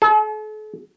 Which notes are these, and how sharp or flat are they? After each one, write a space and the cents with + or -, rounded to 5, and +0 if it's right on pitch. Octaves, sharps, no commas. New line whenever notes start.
A4 -45